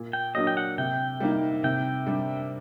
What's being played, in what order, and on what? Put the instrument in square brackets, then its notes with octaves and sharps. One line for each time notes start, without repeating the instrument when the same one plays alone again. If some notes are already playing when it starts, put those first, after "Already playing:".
Already playing: [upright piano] A#2
[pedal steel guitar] G5
[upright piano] F#3 A#3 D4 [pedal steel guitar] D#5
[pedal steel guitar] G5
F#5
[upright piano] C3 [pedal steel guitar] G5
[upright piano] G3 A#3 D#4
[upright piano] C3 [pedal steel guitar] G5
[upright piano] G3 D4